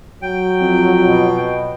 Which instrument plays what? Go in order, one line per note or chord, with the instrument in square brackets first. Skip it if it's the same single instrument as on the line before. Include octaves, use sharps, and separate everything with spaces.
[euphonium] F#3 [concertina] G5
[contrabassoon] F2
[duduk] B2